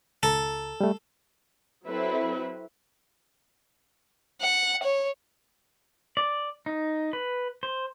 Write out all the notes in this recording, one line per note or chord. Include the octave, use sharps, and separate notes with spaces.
C#2 A4 A#5
G3 A3
F#3 C4 E4 A4 B4 E5
F#5
C#5
D5
D#4
B4
C5